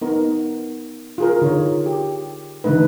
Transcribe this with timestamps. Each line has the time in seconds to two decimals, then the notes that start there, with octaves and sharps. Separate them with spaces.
0.02 B3 D#4 A#4
1.18 F4 G#4 A#4
1.42 D3 D#4 F4 C#5
1.86 G4
2.64 D3 E3 A3 D#4 B4